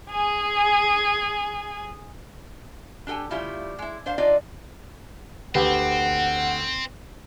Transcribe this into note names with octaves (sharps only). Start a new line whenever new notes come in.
G#4 G#5
D4 G4 A4 G5 G#5
C#3 G3 A3 E4 F4
G#3 E4
D4 C5 F5
D4 D#4 F4 A4 D5 D#5
D2 D3 C4 D4 G4 B4 F#5